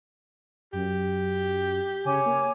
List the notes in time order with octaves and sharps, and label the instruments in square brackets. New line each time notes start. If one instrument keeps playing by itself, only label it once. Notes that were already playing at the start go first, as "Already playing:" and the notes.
[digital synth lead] F#2 [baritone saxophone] G4
[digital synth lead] C#3 [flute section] C#5 G#5 D6
[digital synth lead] A#3